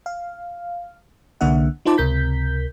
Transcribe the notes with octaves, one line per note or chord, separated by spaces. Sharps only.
F5
C2 D3 A#3 D4 E5 F#5
D#4 F4 C5 A5 D6
C#2 C3 A#4 G6 B6